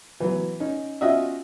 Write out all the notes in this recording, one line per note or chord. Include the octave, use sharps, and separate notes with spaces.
E3 F#3
C#4 D#4
C#4 F4 F#4 D#5 E5